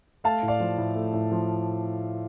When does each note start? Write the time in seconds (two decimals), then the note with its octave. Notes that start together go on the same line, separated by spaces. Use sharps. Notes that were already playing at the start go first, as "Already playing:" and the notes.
0.24 A3 F5 A5
0.43 A2
0.48 D5 F5
0.60 F3
0.78 A2
0.95 A3
1.13 A2
1.32 F3